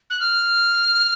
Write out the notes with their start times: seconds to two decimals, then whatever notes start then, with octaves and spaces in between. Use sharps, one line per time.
0.10 F#6
0.20 F6